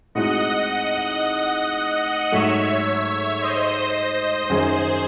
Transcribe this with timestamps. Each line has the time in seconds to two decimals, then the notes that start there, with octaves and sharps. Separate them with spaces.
0.15 A2 G#3 C4 D#4 F#4 D#5 F#5
0.69 D#5 F#5
2.32 G#2 F#3 A3 C#5 E5
3.42 C5 D#5
4.50 F#2 D#3 F#3 C#4 G#4 C5